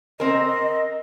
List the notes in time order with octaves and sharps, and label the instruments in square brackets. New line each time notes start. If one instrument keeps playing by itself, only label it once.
[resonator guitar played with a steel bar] C4 A#4 [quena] D#5